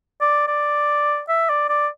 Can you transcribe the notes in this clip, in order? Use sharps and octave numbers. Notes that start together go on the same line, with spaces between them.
D5
D5
E5
D5
D5